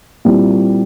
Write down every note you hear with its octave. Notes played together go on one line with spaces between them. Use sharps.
A#2 G3 C4 E4